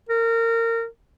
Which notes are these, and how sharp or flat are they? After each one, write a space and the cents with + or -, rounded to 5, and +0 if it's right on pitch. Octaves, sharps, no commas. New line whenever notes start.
A#4 -25